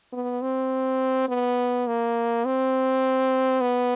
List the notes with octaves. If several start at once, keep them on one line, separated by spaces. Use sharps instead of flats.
B3
C4
B3
A#3
C4
B3